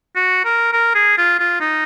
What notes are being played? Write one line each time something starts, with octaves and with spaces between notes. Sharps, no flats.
F#4
A#4
A#4
G#4
F4
F4
D#4